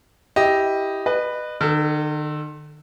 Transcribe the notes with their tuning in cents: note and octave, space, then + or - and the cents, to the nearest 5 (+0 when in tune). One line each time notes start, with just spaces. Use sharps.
E4 -10 G4 +0 D#5 +0
B4 +0 D#5 -35
D#3 -45 A4 +0